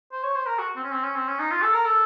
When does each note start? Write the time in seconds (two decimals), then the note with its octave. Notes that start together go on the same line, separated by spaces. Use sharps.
0.12 C5
0.23 C#5
0.35 C5
0.46 A#4
0.59 F#4
0.76 C4
0.84 C#4
0.92 C4
1.04 C#4
1.16 C4
1.28 C#4
1.39 D#4
1.51 F4
1.62 A4
1.74 A#4
1.85 A4